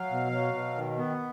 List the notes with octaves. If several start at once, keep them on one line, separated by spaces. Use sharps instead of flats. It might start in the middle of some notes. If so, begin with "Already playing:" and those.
Already playing: F#3 F5
B2
F#3
B2
D#3
B3